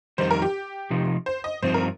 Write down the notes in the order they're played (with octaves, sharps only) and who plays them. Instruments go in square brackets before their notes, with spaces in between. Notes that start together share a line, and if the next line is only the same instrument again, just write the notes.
[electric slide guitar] F2 D#3 G3 D#4 [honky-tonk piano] C5
[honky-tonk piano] A#4
G4
[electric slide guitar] C3 F3 D#4
[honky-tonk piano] C5
D#5
[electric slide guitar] G2 F3 C4 D#4 [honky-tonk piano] C5
[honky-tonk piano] A#4